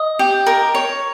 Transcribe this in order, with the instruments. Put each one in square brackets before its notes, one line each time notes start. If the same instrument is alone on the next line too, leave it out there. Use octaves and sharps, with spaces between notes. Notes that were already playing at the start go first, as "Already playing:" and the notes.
Already playing: [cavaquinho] D#5
G4
A#4
C#5